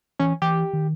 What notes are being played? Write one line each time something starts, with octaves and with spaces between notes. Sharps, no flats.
E3 C#4
E3 G4
D#3